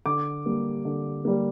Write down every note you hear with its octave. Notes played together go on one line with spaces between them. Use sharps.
D3 D6
G3 A#3
D3
G3 A#3